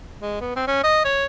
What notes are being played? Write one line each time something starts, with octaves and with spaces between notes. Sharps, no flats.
G#3
B3
C4
C#4
D#5
C#5